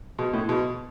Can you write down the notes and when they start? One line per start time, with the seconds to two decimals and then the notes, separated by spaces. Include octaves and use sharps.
0.19 B2
0.33 A2
0.49 B2